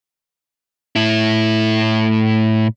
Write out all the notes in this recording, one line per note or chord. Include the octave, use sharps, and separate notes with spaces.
A2 E4